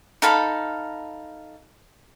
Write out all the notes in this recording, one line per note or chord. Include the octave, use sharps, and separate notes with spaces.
D#4 A4 F5 B5